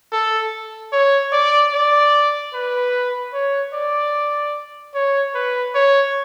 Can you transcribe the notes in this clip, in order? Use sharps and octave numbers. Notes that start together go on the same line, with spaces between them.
A4
C#5
D5
D5
B4
C#5
D5
C#5
B4
C#5